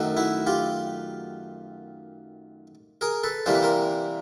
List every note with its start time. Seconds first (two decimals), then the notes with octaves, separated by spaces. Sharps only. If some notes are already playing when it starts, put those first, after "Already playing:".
Already playing: F#2 D#3 F#3 A3
0.17 E4 F#4
0.47 F4 G4
3.01 G#4 A#4
3.24 A4 B4
3.46 C3 E3 G3 A#3 C5
3.55 B4
3.62 A#4 C5